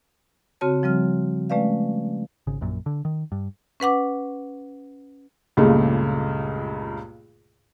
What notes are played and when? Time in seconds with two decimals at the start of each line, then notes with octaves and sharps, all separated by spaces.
0.61 C#3 C4 F#4 C#5 A5
0.83 F3 G3 C4 F6
1.50 G#3 A3 C#4 B4 D5 F5
2.47 G#1 C#3
2.61 A#1 F#2 A#2
2.86 D3
3.05 D#3
3.32 G2
3.80 C#4 B4 F#5 D6
5.57 C#2 G2 A#2 C#3 A3